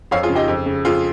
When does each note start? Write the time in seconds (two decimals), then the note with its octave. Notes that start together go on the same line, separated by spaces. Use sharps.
0.11 F2 C#5 F5
0.23 F4 G#4
0.29 C#3
0.35 D#4 G4
0.48 F2
0.66 C#3
0.85 F2 F4 G#4